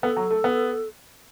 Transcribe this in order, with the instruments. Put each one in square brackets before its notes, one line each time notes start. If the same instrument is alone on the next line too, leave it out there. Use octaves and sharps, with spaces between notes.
[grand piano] B3 [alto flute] A4
[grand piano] F#3
A3
B3